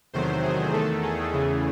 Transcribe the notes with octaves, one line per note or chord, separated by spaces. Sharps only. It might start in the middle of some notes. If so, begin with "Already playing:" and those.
E2 C3 D#3 F#3 A3 C5
G#4
E2 D#3 A3 A4
G#4
E2 C#3 E3 A3